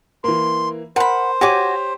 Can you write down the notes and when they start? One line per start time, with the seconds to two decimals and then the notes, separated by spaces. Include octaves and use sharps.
0.24 E3 A#3 C6
0.96 A#4 C5 F#5 B5
1.41 F#4 G4 C#5 G#5 D6